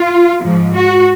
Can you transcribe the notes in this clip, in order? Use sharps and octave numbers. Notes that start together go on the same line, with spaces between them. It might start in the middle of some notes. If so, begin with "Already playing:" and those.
Already playing: F4
G#2 F3
F#4